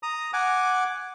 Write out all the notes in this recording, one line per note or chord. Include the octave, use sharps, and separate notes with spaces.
A#5 D#6
F#5 G#5 D6